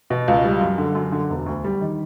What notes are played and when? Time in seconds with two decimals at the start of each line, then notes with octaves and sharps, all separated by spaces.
0.10 B2
0.28 C#2
0.45 G3
0.61 F#2
0.78 D3
0.95 F#2
1.12 D3
1.30 E1
1.46 D2
1.64 G3
1.81 D#3